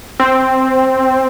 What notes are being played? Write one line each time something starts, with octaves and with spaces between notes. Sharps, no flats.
C4